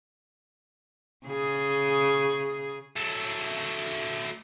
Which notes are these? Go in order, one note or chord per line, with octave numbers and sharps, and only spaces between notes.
C#3 G#4
F#3 A3